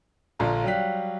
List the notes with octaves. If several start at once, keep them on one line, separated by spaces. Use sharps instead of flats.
A#1 D3 F4 A#5
F#3 G3 G4 F5 F#6 B6